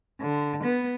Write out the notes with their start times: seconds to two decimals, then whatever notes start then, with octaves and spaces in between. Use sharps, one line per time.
0.21 D3
0.64 B3